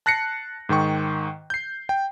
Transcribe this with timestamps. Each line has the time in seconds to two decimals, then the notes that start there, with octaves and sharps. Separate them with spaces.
0.06 A5 F#6 A#6 C7 C#7
0.69 G#2 D#3 G5 C#6
1.50 G6 C7
1.89 G5